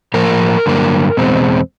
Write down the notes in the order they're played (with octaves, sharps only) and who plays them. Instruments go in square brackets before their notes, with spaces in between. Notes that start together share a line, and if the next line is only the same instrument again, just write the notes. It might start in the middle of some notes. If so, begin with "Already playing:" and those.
[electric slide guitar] A2 F3 A#3 A#4
G2 D3 F#3 A#3
E2 B2 G#3 C4